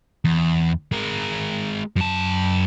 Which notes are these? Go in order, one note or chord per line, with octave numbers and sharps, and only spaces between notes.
E2
G#3 A#4
F#2 A5